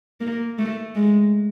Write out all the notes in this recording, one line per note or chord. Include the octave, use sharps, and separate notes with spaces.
A#3
A3
G#3